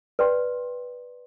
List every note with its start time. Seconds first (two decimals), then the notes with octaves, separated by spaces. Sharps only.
0.19 B4 D5 G5 C6